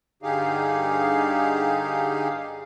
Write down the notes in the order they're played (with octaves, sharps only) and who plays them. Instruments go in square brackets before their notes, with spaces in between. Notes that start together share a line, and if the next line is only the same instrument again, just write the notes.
[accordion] G2 D3 D#4 G4 G#4 F5